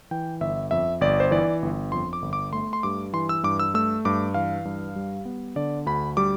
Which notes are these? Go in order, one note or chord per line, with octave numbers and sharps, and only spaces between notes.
E3 G5
G1 E5
F2 E5
G1 D5
C5
E3 D5
G1
F2 C6
D6
G1
D6
A3 C6
C6
G2 D6
E3 C6
E6
G2 D6
E6
A3 E6
G2 D6
E3 F5
G2
G3
B3
D3 D5
D2 B5
G3 D6